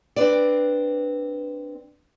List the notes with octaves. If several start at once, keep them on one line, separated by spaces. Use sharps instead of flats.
C4 D4 B4 D5